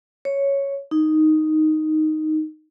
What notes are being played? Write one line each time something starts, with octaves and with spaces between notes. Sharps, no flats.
C#5
D#4